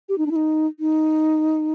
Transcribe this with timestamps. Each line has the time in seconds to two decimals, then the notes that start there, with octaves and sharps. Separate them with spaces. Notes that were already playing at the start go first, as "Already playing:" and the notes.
0.09 G4
0.18 D#4
0.26 D4
0.31 E4
0.36 D#4
0.80 D#4